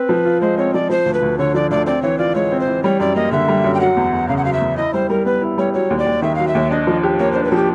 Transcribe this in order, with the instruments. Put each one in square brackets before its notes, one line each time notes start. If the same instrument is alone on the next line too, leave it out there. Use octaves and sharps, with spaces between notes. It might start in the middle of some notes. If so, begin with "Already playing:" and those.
Already playing: [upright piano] C4 [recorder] B4
[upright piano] F3
F4
[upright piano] G#3 [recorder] C5
[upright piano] C4 [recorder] C#5
[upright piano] F3 [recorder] D5
[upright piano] F3 [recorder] C5
[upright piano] D2
[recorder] B4
[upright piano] D2
[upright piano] D3 [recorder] C#5
[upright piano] F3 [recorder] D5
[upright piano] D2 [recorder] D5
[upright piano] C4 [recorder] D5
[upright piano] E3 [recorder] C#5
[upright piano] F4 [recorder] D5
[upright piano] G#3 [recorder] C#5
[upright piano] C4
[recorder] C5
[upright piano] E3
[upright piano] G3 [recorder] C#5
[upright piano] F#2 [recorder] D5
[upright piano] A#3 [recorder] D#5
[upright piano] D3 [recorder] E5
[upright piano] G3
F#2
[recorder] G5
[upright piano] F#3 [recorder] F#5
[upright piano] E2
E2
[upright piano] C#3 [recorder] F5
[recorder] F#5
[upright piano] F#3 [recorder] F5
[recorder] E5
[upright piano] E2
[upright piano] E4 [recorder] D#5
[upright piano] G3 [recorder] C5
[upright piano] G3 [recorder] A#4
[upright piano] B3 [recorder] B4
[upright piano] E4
[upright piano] G3 [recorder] C#5
[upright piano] F#3 [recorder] C#5
[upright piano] D#2
[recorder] D5
[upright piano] D#2
[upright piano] D#3 [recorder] E5
[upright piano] F#3 [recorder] F5
[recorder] E5
[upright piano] D#2
[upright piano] D4 [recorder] D#5
[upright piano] F3
G4
[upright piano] A#3 [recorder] C#5
[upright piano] D4 [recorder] C5
[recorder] B4
[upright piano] F3 [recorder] F#4 G4